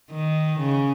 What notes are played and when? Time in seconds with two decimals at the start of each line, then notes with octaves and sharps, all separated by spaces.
0.11 D#3
0.59 C#3